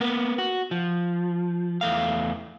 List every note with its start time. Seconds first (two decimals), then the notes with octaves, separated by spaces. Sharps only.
0.01 A#3 B3
0.38 F#4
0.71 F3
1.81 E2 A3 F5